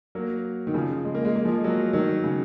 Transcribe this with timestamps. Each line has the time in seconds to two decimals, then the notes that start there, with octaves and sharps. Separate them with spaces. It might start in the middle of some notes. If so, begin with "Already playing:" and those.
0.15 F#3 A#3
0.67 D#3
0.74 C#3 F3
1.05 G#3
1.15 A#3
1.25 G#3
1.35 A#3
1.45 F3 G#3
1.64 F#3 A#3
1.93 D#3 F#3
2.23 C#3